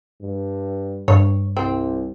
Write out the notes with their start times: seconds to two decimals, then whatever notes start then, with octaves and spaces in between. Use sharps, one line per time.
0.22 G2
1.08 G2 C#5
1.57 C2 C4